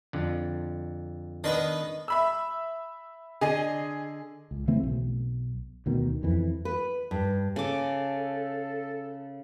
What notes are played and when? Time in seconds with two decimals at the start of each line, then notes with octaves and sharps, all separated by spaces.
0.13 F2 D3
1.44 D#3 B3 D4 B4 D#5
2.08 E5 B5 E6
3.41 D3 G#4 D#5 G#5
4.51 C#2
4.68 C#3 E3 A3 C4
4.83 B1
5.86 D2 B2 D#3
6.23 F2 E3
6.65 B4
7.11 G2
7.56 C#3 A4 D6